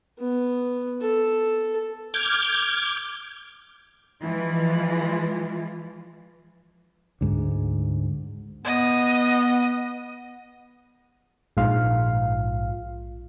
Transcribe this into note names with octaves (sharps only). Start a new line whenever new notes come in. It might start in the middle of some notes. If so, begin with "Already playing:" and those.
B3
A4
D6 F6 G6 G#6
E3 F3 G#3 F4
D2 G#2 D3
B3 D#5
A#1 G#2 F4 F5